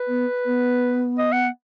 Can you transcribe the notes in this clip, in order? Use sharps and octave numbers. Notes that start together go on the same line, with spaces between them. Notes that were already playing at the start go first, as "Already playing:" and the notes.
Already playing: B4
B3
B3
D#5
F#5